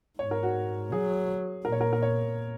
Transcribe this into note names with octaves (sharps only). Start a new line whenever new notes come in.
G#2 C#5
A#4
F#4
F#3 G#4
A#2 A#4
C#5
A#4
A#4
C#5